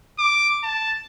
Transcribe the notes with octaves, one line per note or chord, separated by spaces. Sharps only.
D6
A5